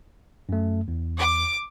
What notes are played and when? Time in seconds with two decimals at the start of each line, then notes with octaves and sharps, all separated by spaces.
0.49 F#2 A3
0.88 E2
1.18 D6